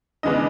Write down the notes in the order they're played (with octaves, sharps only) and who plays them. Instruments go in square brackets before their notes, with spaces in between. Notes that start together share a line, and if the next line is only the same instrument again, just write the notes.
[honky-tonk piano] C#3 E3 G#3 B3 D4 D#5